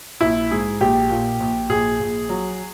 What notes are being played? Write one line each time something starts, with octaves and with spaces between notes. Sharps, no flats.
A#1 E4
G#2 G#4
A#1 G4
A#2
A#1
A#1 G#4
A#1
F#3